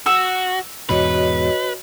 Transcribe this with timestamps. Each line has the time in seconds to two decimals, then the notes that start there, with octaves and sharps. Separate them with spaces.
0.06 F#4 E6
0.89 E2 G#2 B2 F#4 B4 C#5 D#5